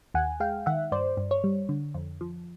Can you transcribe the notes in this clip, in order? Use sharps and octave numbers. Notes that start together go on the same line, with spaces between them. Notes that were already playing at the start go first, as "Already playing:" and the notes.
D#2 F#5 G#5
G#3 F5 G5
D#3 E5 F#5
G2 C5 D5
G2
C#5
G3
D3
F2
F3